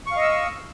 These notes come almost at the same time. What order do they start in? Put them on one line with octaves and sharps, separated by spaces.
C#6 F5 D#5 E6